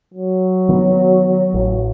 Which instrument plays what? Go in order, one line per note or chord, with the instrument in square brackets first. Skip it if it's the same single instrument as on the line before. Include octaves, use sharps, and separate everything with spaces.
[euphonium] F#3
[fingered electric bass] D#3 B3
A1